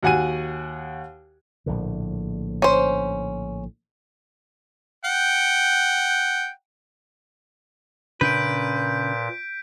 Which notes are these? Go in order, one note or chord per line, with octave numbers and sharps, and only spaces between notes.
D#2 F#4 F#5 G#5 D#7
A#1 A2 D3
C#4 C5
F#5 G5
A#2 C#3 C#4 D4 B4 G6 B6 D7